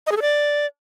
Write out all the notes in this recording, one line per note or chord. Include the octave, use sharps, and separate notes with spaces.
D#5
G#4
A4
D5